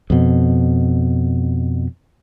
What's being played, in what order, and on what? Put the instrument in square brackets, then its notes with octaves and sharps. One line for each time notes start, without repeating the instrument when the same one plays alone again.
[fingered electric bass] F2 B2